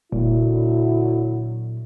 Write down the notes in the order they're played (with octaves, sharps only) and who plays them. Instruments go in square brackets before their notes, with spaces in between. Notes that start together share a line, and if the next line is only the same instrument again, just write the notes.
[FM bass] E1 [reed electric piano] A#2 [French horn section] D3 F#3 E4